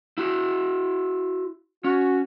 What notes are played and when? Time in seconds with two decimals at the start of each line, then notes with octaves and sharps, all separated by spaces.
0.18 E4 F#4
1.84 C#4 F#4